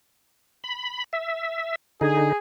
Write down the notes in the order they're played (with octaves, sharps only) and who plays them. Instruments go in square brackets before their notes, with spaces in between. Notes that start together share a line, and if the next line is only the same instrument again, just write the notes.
[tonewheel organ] B5
E5
[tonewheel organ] D3 D#4 [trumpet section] G#4